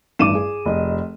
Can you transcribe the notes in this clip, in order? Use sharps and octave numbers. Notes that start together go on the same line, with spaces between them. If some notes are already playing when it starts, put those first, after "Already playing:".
A1 G2 D#3 D6 D#7 E7
G#4
F1 D#5